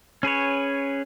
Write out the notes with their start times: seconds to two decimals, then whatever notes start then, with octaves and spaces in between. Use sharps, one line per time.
0.23 C#4 G#4 B4 C#5